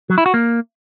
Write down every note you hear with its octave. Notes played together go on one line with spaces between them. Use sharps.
F#3
E4
F#4
A#3